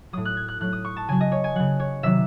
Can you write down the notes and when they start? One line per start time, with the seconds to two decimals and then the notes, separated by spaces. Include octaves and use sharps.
0.13 A2 F#3 D#6
0.25 F#6
0.37 G#6
0.48 F#6
0.60 A2 F#3 F#6
0.73 D#6
0.85 C#6
0.97 A5
1.08 C#3 F#3 G#5
1.21 D#5
1.32 C#5
1.44 G#5
1.55 C#3 F#3 F#5
1.80 C#5
2.03 C3 D#3 F#3 E5